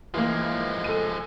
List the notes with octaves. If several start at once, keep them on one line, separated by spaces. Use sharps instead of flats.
E3 F3 G#3 A#3
A4 D#7